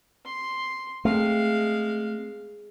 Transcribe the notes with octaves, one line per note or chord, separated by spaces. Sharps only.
C6
G#3 A3 C4 F5